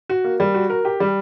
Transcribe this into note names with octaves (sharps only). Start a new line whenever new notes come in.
F#4
A#3
G3
F#4
A#4
G4
G3